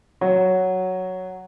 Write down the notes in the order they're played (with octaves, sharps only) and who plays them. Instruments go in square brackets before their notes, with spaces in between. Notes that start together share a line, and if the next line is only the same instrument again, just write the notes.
[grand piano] F#3 F#4